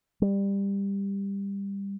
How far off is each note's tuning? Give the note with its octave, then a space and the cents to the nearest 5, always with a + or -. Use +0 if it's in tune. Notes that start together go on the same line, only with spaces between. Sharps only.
G3 +20